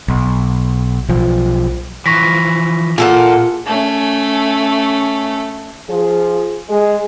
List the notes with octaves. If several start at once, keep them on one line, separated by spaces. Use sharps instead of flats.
B1
B1 F3
E3 F3 C#6 A#6 B6
A#2 A#3 F4 G#4 A4 F#5
A3 C#4
F3 G#4
G#3 G#4